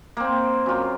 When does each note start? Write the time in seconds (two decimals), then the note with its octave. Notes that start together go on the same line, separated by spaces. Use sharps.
0.17 A#3 C4
0.66 F#2 F4